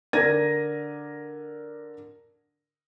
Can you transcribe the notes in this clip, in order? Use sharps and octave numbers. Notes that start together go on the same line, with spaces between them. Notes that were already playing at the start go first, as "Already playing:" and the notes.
D3 A#4 D5 G#6 A#6 D#7